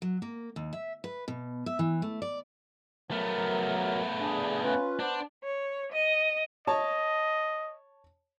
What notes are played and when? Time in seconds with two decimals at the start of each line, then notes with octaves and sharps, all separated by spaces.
0.02 F#3
0.22 A#3
0.56 D#2
0.73 E5
1.04 B4
1.28 B2
1.66 E5
1.79 E3
2.02 A3
2.22 D5
3.11 F#3 A3 B3 A#4
4.20 D4 G#4
4.64 C#4 F4 B4
4.99 B3 D4 C5
5.43 C#5
5.92 D#5
6.67 C#5 D#5 A5